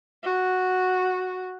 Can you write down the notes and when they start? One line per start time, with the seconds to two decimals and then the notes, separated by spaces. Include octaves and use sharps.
0.23 F#4